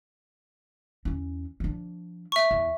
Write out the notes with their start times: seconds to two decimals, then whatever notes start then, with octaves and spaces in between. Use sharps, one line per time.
1.05 E2 C#4
1.60 F3 D4
2.32 E5 C#6
2.51 E2